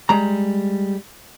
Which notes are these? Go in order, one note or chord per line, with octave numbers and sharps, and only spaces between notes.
G3 G#3 A#5